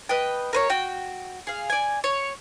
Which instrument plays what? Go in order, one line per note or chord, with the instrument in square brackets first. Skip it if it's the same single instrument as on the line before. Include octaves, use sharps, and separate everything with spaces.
[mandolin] B4 D#5 G5
A#4 B4 C#5
F#4 G5
G#4 F5
D5 G#5
C#5